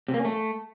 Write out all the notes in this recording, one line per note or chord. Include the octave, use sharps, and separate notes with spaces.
C3
A#3
C#4
A3